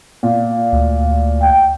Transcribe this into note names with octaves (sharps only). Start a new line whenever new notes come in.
A#2
D2
G5